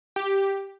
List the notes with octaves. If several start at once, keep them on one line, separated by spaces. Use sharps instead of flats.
G4